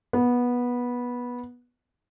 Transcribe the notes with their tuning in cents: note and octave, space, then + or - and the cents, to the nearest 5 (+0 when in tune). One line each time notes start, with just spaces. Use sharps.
B3 -15